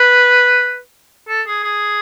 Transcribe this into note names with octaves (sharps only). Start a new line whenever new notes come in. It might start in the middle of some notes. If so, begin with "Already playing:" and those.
Already playing: B4
A4
G#4
G#4